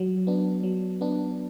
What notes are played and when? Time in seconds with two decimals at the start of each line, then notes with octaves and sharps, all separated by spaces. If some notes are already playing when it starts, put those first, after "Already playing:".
Already playing: F#3
0.27 B3 D4
0.63 F#3
1.01 B3 D4